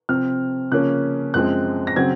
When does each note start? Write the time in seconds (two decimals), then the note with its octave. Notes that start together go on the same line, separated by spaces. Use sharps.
0.09 C3 F3 C4 F6
0.72 C#3 F3 A#3 C#4 F#6
1.34 F#2 F3 G#3 C4 F#6
1.87 A#6
1.96 C#3 F#3 C4 G#6